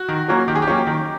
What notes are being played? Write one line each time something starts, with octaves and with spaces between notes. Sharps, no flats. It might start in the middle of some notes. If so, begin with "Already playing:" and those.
Already playing: F#4
D#3
F#3 A#3 C#4
D#3 G4
G#4
G4
F#3 A#3 C#4
D#3